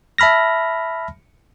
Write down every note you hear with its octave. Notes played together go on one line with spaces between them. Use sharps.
E5 A5 B5 F6 A#6